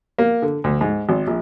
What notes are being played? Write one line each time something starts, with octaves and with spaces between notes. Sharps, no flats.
A#3
D3
D2
G#2
G#1
A#1